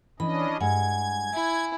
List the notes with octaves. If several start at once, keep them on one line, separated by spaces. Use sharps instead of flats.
E3 C#4 D4 D#5 B5
G2 G#3 F#5 G#5 G#6
E4